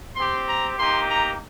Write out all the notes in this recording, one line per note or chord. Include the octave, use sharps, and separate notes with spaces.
C4 G4 C6
A#5
A#3 D#4 G4 C6
A#5